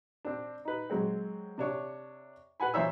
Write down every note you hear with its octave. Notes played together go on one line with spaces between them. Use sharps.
C4 D4
D#4 B4
F#3 G#3 C4
C3 D4 C#5 C#6
B4 F#5 G#5 B5
A#2 E3 C5 C#5 E5 E6